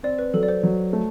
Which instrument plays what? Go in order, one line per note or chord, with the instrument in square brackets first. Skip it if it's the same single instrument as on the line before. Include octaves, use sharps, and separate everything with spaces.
[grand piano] C4 [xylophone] D5
[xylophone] B4
[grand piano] F#3 [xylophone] A4
[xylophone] D5
C5
[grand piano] F#3
A3